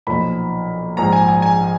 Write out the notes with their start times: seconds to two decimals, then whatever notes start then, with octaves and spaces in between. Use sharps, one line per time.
0.07 B1 A#2 F3 B5
0.97 A#1 G#2 F3 A#5
1.12 G#5
1.28 G#5
1.42 G#5